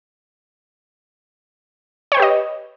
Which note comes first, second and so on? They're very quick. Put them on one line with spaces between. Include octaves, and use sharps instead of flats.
C#5 G5 B4 G4 D#5